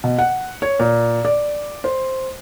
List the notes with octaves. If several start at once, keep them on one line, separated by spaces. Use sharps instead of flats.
B2
F#5
C#5
A#2
D5
C5